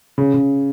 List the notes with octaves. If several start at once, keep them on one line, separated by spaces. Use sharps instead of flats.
C#3
C#3